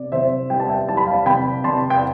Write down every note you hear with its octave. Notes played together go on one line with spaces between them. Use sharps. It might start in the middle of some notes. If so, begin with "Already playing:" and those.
Already playing: C3 D5
C3 C5 E5
G3 G5
A5
E5 G5
G3 A5
B5
F5 A5
C3 G5 B5
C3 A5 C6
G5